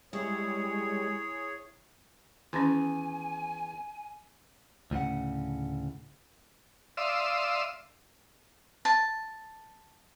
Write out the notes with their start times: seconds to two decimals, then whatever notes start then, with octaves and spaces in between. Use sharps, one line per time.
0.13 G3 G#3 E4 G#4 C#5
2.53 E2 D#3 C#4 G#5 A5
4.91 D2 A2 C#3 F#5
6.97 D5 E5 F5 C6 D#6 E6
8.85 A5